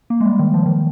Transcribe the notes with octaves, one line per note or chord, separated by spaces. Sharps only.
A#3
G#3
G3
D#3
F3
D#3